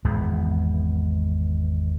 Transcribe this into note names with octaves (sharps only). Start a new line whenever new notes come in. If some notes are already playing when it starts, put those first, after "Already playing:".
G#1 E2 G#3 B3